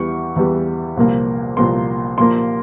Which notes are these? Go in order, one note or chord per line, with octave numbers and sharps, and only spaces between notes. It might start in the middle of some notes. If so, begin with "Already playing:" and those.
Already playing: E2 E3 G3 C#6
E2 E3 G3
C2 A#2 F3 A#3
C2 A#2 F3 A#3 C6
A#2 F3 A#3 C6